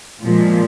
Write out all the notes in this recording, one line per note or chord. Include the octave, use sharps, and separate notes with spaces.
A#2 F3 G#3